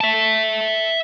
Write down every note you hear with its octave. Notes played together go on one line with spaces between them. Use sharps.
E5 A5